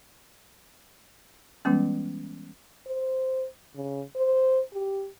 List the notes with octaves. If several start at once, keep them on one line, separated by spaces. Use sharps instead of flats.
E3 G3 G#3 B3 C#4
C5
C#3
C5
G4